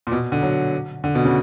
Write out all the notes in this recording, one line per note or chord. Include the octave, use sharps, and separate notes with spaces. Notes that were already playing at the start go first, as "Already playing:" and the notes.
A#2
B2
D3
F#3
D3
B2
C#3